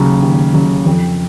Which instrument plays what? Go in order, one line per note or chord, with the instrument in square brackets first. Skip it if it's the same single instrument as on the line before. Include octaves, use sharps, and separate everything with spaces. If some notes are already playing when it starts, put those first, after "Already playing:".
Already playing: [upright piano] D#2 C#3 F#3
D#2
C#3 F#3
F2